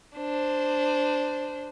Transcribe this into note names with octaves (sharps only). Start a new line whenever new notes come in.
D4 C5